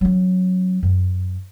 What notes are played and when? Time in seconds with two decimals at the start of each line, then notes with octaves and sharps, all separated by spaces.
0.01 F#3 C#4
0.83 F#2